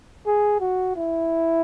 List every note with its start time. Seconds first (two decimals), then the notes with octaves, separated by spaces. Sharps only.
0.26 G#4
0.60 F#4
0.96 E4